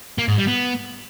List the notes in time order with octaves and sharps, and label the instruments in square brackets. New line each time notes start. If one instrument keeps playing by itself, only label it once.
[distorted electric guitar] A#3
G#2
G3
B3